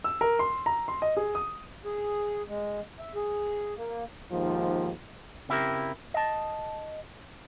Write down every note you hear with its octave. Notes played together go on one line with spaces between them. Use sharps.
E6
A#4
C6
A#5
C6
D#5
G#4
D#6
G#4
G#3
E5
G#4
A#3
D#2 G#2 F3
C#3 C4 E4 F#4 G4 A#4
D#5 A5